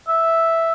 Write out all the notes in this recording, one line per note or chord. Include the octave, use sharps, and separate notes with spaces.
E5